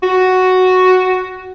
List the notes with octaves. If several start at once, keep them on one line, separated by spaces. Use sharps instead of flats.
F#4